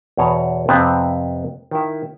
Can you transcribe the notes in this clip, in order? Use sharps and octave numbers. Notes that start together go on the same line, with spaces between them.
E2 B2 C#5 A#5
F2 C3 B3 C4
D#3 E4